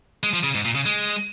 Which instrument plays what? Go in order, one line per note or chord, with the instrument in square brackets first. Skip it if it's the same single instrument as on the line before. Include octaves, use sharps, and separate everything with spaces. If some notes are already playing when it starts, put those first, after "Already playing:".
[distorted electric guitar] G#3
F3
C#3
G#2
A#2
C#3
G#3